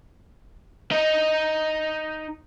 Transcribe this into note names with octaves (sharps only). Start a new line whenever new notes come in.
D#4 D#5